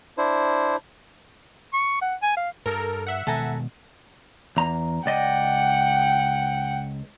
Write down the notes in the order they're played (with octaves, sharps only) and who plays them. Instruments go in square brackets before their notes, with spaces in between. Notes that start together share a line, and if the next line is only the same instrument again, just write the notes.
[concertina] D4 E4 C5
[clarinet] C#6
F#5
G#5
F5
[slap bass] G2 [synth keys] A4 A#4
[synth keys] E5 F#5
[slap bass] B2 D#3 G#3 [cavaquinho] A4 G#5 A#5
[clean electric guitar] E2 A#5
[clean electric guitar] C#2 D5 D#5 [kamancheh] F#5 G5